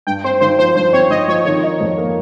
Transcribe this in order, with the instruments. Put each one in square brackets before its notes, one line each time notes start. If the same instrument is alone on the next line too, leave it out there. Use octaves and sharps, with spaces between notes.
[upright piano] G2 [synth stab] G5
[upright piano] C4 [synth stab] C5
[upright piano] G#1 [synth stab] C5
[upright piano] F3 [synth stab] C5
[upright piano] G2 [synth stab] C5
[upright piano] C4 [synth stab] C#5
[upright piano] G#1 [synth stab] D#5
[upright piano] F3 [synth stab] C#5
[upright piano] D#3 [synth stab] C#5
[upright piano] D#4
F2
A#3